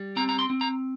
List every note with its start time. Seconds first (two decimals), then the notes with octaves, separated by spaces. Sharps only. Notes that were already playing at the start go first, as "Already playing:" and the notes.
Already playing: G3
0.16 C4 A#5
0.29 A#5
0.39 C6
0.50 C4
0.61 A#5